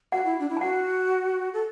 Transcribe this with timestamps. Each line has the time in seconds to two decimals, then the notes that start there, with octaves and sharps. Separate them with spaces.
0.12 F#4 F#5
0.25 E4
0.40 D4
0.49 E4
0.57 A5
0.61 F#4 F#5
1.54 A4